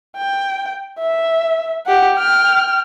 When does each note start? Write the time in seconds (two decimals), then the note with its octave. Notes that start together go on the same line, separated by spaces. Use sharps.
0.17 G5
0.99 E5
1.86 G4 F#5
2.16 G5 F6